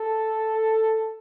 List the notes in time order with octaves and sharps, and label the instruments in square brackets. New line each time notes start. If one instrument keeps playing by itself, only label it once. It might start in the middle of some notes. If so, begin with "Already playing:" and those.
Already playing: [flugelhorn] A4